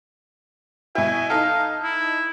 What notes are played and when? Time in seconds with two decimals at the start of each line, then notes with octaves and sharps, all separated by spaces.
0.95 B2 E4 G#5
1.30 D#4 A4 F5
1.83 E4